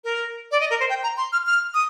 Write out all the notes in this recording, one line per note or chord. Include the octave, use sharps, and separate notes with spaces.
A#4
D5
D#5
A#4
C5
G5
A#5
C6
F6
F6
D#6